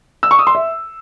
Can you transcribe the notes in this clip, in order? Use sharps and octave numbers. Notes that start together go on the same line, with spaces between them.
E6
C#6
D#6
C6
E5